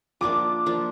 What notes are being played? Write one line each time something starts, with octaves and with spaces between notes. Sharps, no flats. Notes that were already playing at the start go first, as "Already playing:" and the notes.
F3 A#3 D4 F4 D6
F3 A#3 D4 F4